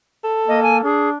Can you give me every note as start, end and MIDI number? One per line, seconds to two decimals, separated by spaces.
0.24 0.84 69
0.48 0.80 58
0.48 0.62 75
0.63 0.77 80
0.83 1.17 62
0.83 1.09 68